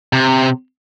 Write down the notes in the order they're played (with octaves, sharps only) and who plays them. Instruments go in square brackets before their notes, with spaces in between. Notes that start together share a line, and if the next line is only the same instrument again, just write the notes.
[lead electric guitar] C3